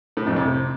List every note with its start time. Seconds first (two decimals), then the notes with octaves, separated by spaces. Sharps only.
0.17 A2
0.26 F2
0.36 C3